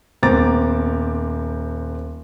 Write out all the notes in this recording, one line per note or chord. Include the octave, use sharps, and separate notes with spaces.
D#1 B3 C4 A#5 D6 A6